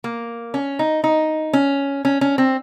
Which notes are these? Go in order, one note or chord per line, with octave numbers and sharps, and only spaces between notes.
A#3
C#4
D#4
D#4
C#4
C#4
C#4
C4